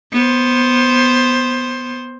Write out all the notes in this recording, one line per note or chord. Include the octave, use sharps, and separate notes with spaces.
B3 C5